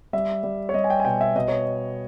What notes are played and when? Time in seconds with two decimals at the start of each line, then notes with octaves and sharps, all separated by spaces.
0.13 G3 E5
0.43 G3
0.69 C#5
0.74 G3 D#5
0.84 G#5
0.90 G5
1.00 G#5
1.05 B2 G5
1.21 E5
1.35 B2 D#5
1.48 C#5